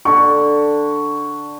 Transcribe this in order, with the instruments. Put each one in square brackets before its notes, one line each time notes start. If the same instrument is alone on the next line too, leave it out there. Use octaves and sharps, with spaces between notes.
[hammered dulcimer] D3 [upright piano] C#6